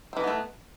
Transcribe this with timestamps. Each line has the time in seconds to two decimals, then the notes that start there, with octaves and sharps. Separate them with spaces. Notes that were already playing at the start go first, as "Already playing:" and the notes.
0.13 C4
0.17 E3
0.20 D#4
0.24 B3
0.27 A3